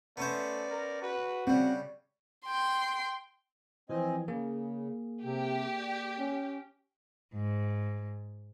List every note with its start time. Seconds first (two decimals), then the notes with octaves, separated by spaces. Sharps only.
0.17 A3 B3 C#4 C5 D5
0.71 A#4
1.02 F#4 B4
1.47 C#3 G3 C4 F#5
2.46 G5 C6
3.90 E3 F3 C4 D#5 G#5
4.28 C#3 A#3 G#4
5.24 C3 G4
5.73 D5
6.18 C#4
7.34 G#2